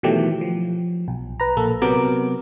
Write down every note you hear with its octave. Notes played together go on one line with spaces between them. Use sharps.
B2 D#3 E3 F#3 A3 G4
F3
B1
B4 A#5
A#1 A#3 A4
C3 F#3 B3 A#4 D6